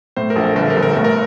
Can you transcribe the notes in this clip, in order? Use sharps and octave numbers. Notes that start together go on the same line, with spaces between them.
A2 C5
A#4
A#1
A4
G1 A4
A#4
G1
A#4
A2 A4
A#4